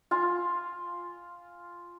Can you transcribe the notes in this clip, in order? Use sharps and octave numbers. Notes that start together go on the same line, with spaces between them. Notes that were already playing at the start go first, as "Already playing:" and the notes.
F4 F5 G#5